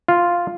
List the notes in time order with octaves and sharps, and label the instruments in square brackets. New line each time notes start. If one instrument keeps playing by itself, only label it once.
[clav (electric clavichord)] F4